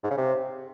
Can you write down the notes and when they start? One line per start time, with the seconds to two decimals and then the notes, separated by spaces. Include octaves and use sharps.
0.04 G#2
0.11 C#3
0.17 C3